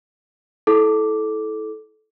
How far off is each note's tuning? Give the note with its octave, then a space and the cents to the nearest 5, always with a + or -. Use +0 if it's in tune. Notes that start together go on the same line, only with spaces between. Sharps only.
E4 -15 A4 -20 D6 +0